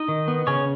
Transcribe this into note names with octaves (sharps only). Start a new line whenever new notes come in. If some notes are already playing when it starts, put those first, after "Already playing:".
Already playing: D#4 D#5
D#3
B3
C#3 C#4 C#5